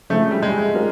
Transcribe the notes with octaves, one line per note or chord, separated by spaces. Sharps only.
C#3 F3 G#3 A3 C4 E4
G3
G#3
G3 C4 F4 A#4